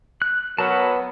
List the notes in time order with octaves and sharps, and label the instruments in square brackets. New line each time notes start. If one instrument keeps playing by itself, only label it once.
[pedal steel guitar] F#6
[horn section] F#3 A#4 [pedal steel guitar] B3 B4 A5